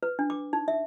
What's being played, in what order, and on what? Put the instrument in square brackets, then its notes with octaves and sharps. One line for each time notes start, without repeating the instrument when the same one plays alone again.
[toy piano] B4
D4
D6
D#4
E5